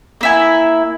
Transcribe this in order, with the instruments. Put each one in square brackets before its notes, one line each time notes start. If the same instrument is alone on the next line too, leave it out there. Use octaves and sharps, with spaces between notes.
[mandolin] A#3 E4 G#5